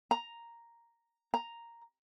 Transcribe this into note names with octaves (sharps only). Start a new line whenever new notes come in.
A#5
A#5